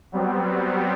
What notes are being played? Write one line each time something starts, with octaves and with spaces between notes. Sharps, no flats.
F#3 G3 B3 C4